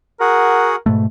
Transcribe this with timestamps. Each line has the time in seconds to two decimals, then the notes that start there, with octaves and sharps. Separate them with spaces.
0.20 F#4 G#4 A#4 F#5
0.86 G#2 B2 A3